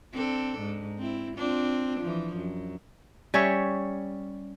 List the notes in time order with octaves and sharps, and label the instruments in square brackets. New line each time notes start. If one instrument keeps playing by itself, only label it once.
[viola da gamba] C4 D4 A4
G#2
C4 E4
C4 D4 F4
E3 F3
F#2
[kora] G3 C#4 C#5 E5